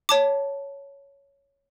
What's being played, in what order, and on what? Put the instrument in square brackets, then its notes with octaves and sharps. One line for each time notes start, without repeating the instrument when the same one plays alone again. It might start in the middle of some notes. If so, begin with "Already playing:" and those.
[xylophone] C#5 A5 D6